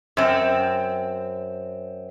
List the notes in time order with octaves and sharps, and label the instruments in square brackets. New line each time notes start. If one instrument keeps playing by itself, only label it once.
[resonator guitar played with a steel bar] F#2 C4